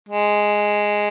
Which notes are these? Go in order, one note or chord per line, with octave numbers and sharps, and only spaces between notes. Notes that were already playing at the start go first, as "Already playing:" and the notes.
G#3